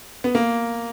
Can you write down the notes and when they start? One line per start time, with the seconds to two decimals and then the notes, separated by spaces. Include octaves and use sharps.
0.24 B3
0.35 A#3